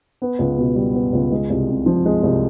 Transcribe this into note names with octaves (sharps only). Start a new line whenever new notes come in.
B3
C#2
B2
G3
B3
C#2
G#3
C2
C3
F3
G#3
C2